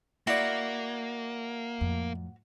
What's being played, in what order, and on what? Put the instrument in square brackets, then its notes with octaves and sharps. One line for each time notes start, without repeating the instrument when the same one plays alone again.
[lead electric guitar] A#3 [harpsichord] E4 D5 [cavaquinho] F#4
[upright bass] F2 A2